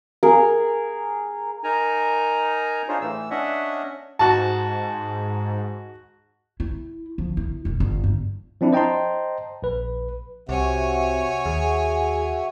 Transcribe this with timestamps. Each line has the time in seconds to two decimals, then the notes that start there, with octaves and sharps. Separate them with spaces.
0.23 G#4 A#4
1.64 D#4 A#4 G#5 A#5
2.88 D4 D#4 F4 G#4 C5 C#5
3.01 A2 E3 E6
3.31 C#4 D4 C#5 D#5 E5 F#5
4.19 G#2 F#4 A5
6.60 E4
7.18 F3
7.37 E4
7.65 E1 G#3
7.80 G1
8.04 G2
8.61 F3 C4 D4 E4
8.73 C5 D#5 G5 A5 A#5 C6
9.62 A#1 B4
10.49 C2 C3 F#4 C#5 E5 F#5 G#5
11.46 D#2 G#4